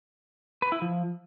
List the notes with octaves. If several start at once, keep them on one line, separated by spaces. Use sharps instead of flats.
B4
E4
F3